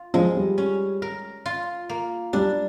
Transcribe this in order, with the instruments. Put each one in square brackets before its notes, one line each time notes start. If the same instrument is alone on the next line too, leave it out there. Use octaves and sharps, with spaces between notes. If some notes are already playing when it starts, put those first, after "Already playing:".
Already playing: [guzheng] F4
[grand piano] F3 [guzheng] G#3
[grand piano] G3
[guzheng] C#4
A#4
F4
A#3
[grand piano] G3 [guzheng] D4